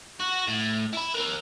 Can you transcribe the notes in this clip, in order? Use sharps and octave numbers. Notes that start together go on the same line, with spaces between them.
F#4
A2
E4 B5
G4 A#4